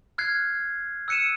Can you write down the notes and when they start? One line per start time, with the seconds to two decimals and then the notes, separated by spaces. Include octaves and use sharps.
0.18 F6 F#6 G#6 C7
1.08 E6 F#6 C#7 D#7 E7